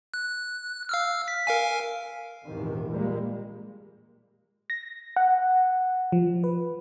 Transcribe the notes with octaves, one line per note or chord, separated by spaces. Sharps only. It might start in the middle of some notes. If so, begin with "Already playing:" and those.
F#6
F5 E6 F6
B6
A#4 F5 G#5
A#1 E2 G#2 C3 D#3
A#2 G3 G#3 A#3
A#6
F#5
F3
B4